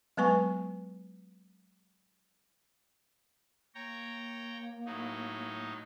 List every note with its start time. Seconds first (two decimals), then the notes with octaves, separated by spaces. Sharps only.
0.17 F#3 G#3 B3 B4 G#5 C#6
3.75 A#3 C#5 G5 A#5
4.86 A2 F#3 D#4